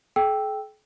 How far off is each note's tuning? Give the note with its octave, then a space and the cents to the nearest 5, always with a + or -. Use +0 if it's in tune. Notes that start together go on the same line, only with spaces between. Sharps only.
G#4 +45 G5 +0 E6 +0